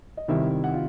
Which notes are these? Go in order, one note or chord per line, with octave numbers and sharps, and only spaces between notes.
D#5
C3 D#3 G3 C4 E4 E5
F#5
F4